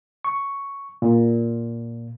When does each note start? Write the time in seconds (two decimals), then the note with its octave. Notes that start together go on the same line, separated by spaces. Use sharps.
0.25 C#6
1.02 A#2